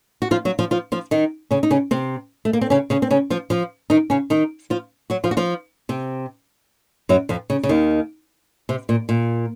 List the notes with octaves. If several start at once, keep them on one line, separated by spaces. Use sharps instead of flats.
F#4
F3 F4
F#3 F#4
F3 F4
F3 F4
F3 F4
D#3 D#4
C#3 C#4
D#4
C#3 C#4
C3 C4
A3
A#3
C4
C#3 C#4
C#3 C#4
C4
C#3 C#4
F3 F4
F3 F4
D#3 D#4
C#3 C#4
D#3 D#4
F3 F4
F#3 F#4
F3 F4
F#4
F3 F4
C3 C4
F#2 F#3
F2 F3
C#3
C#3
D#2 D#3
C3
A#2
A#2